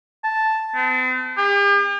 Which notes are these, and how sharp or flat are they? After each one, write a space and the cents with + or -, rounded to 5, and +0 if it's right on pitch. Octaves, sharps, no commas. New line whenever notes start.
A5 -5
C4 -45
G4 +45